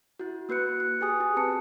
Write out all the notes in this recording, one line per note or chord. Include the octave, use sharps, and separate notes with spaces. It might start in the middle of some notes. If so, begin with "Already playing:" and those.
E4 F#4
A#3 F#4 B4 F#6 C#7
F#6
G4 G#4 G#5 D#6
F#4 G#4
C4 B4 A5 C#7